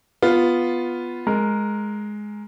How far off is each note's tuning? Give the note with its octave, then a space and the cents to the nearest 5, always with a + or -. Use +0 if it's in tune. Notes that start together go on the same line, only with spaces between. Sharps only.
B3 +0 F4 +0
G#3 +10 A#4 +0